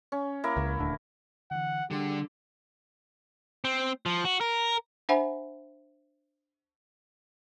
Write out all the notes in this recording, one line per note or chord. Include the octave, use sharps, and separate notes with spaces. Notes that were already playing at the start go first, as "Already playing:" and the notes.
C#4
A#3 E4 A#4
C#2
D#1 D2 D3
D3 E3 F#5
D3 G3 G4 G#4 C6
C4
F3
F#4
A#4
D4 C5 E5 F#5 G#5 B5